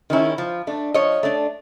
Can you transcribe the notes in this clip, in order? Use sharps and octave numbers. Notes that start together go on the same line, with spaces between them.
D#3 G#3 C#4 E4
F3
A3 D4
F3 C#5 D#5
A3 D4